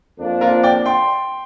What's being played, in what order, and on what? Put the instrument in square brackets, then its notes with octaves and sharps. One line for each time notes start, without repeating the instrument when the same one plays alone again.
[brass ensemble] F2 F3 A#3 D4
[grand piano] F4 A#4
D5 G5
G5 C6